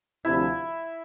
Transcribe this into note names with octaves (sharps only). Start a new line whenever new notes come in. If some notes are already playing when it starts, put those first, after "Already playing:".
D2 C3 F3 E4